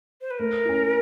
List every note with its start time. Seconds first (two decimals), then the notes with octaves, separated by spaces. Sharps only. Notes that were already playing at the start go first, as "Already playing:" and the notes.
0.21 C5
0.31 B4
0.39 A3 A#4
0.65 C#4 E4